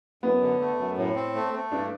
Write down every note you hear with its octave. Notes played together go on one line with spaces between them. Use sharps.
F#2 B3
D3
A3
F#2
A2
C4
A3
A3
G2 D4